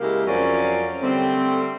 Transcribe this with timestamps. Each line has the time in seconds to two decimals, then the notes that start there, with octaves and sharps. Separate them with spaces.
0.01 C#3 G#3 A#3 E4 G4 A#4
0.26 F2 F3 F#3 C#4 A#4 D5
1.03 D3 G3 A3 C4